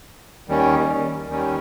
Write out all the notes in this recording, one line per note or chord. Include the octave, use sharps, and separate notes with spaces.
D#2 D#3 G3 C#4
D#2 D#3 G3 C#4